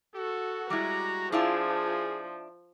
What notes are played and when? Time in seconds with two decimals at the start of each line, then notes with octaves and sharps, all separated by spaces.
0.16 F#4 A4
0.70 G3 G#3 E4 A#5
1.32 F3 D4 E4 F4 G#4